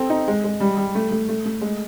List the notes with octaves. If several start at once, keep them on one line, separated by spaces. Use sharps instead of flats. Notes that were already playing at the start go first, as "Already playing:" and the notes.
Already playing: C4 A4
D#4
G#3
G#3
G3
G3
A3
A3
A3
A3
G#3